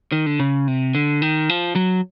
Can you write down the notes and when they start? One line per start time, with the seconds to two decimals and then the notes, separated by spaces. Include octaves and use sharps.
0.12 D#3
0.26 D3
0.40 C#3
0.68 C3
0.95 D3
1.22 D#3
1.49 F3
1.76 F#3